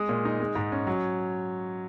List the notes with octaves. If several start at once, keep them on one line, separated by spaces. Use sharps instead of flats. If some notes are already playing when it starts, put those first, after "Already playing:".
Already playing: G#3 D#6
A#2
D#4
G#3
G#2
C#4
F#3